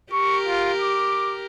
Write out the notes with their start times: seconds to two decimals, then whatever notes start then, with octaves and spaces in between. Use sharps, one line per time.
0.12 G4 A#4 C#6
0.47 F4
0.81 D6